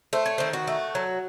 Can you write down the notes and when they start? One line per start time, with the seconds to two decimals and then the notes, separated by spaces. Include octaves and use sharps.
0.13 A3 C5
0.26 C#5
0.38 D#3 C5
0.53 F#4
0.67 A3
0.95 F#3